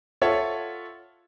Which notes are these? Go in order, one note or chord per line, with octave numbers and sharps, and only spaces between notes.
F4 A4 C#5 E5 F#5